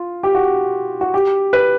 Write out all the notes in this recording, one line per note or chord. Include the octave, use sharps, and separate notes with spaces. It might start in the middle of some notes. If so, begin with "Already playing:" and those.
Already playing: F4
G4
F#4
F#4
G4
B4